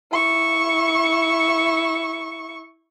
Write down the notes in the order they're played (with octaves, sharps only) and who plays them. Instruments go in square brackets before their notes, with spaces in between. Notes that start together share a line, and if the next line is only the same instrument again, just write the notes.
[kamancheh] E4 C#6